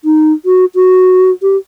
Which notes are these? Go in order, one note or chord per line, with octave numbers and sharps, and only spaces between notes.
D#4
F#4
F#4
G4